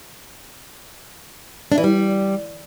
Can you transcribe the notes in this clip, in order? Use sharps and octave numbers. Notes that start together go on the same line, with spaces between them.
D4
E3
G3